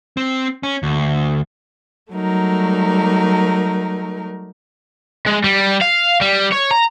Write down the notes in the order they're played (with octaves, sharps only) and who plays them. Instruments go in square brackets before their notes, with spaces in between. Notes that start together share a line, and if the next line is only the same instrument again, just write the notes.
[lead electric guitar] C4
C#4
D2
[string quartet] F#3 G3 A3 D#4 A#4
[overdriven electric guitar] G#3
G3
F5
G3
C#5
A#5